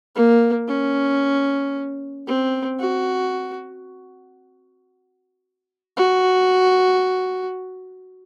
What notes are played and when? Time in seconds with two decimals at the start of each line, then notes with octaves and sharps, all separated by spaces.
0.15 A#3
0.68 C#4
2.27 C4
2.80 F#4
5.97 F#4